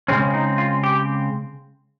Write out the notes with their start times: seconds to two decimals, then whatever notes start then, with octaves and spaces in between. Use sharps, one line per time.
0.08 C#3 G#3 C4 C#4
0.34 D#4
0.58 F4
0.83 G4